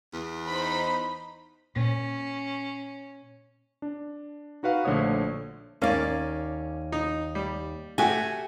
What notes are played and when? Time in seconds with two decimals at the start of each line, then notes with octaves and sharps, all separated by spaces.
0.13 E2
0.48 D#4 C5 B5
1.76 A#2 C#4
3.82 D4
4.63 D#4 F#4 B4 F5 F#5
4.85 A#1 D3 A3 C5 C#5 D#6
5.82 D#2 A#3 C#4 D5 F5
6.92 D#4
7.35 G3
7.98 A3 F#4 G4 G#5